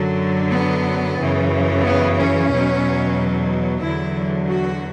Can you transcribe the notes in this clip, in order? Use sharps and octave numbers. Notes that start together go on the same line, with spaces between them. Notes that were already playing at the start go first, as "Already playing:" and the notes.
Already playing: F#2 D3 F#3
B3
F#2 C#3 E3
B3
C#4
E2 B2 F#3
E2 D3 F#3 E4
F#4